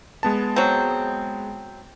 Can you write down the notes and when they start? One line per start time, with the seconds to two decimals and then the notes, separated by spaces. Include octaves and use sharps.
0.23 G#3 B3 A5
0.56 F#3 C4